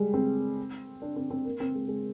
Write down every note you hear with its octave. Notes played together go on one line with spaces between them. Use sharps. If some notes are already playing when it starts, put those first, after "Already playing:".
Already playing: G3 G#3
C4
D4
C4
C4
A#3
C4
G#3
G#3